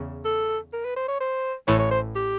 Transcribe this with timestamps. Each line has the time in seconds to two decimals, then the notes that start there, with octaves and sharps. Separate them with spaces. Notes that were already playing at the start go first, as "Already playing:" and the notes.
Already playing: E2 C#3
0.25 A4
0.73 A#4
0.85 B4
0.97 C5
1.08 C#5
1.21 C5
1.68 A1 A2 E3 C#5
1.79 C#5
1.91 C5
2.16 G4